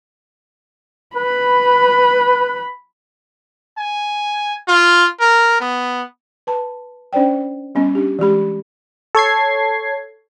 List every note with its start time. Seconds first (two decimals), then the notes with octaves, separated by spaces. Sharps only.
1.16 B4 B5
3.78 G#5
4.68 F4
5.20 A#4
5.60 B3
6.47 B4 A5 B5
7.13 C#4 D4 C5 D5 G5
7.75 G3 B3 C#4 D#5
7.95 C#4 D4 G4
8.19 E3 G#3 G4 B5
9.15 A4 C#5 G#6 C7